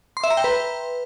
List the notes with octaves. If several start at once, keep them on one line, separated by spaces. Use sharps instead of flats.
C6
E5
A#5
G5
B4